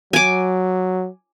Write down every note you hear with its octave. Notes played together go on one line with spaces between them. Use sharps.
F#3 G#5 D6